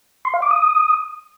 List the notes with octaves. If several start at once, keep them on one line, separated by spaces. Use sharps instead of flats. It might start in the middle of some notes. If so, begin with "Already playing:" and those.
C6
F5
D6
D#6